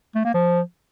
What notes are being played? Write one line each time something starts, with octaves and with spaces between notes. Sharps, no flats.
A3
A#3
F3